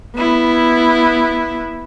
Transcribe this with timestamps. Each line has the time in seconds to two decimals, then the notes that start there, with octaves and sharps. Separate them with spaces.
0.15 B3 E4